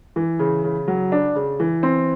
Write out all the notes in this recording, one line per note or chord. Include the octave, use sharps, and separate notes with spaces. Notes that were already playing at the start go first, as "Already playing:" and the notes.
E3
C#3
C#3
F#3
D4
C#3
E3
C4